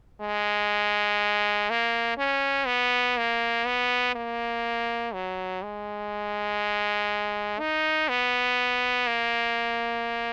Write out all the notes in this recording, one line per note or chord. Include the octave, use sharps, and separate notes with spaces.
G#3
A#3
C#4
B3
A#3
B3
A#3
F#3
G#3
D#4
B3
A#3